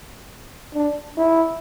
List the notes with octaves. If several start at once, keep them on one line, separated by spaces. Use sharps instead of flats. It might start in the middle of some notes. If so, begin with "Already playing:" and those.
D4
E4